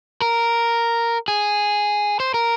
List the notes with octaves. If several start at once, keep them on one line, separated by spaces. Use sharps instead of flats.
A#4
G#4
C5
A#4